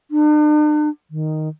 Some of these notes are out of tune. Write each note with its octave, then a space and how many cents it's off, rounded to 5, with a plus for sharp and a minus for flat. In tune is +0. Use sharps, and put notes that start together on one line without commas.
D4 +45
D#3 +0